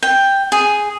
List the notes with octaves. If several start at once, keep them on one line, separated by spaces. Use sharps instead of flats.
G5
G#4